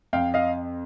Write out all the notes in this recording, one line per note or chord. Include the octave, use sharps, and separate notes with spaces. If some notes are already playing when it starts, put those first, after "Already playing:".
F2 F5 G5
D#5 F5